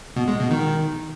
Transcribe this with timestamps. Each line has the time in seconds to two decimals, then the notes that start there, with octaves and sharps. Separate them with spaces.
0.16 B2
0.28 G#3
0.39 B2
0.51 D#3